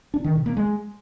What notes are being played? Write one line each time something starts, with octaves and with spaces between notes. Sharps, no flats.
D4
D#3
B2
A#3
G#3